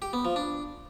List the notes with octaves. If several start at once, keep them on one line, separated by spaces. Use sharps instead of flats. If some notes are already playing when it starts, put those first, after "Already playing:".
G4
B3
F3
D4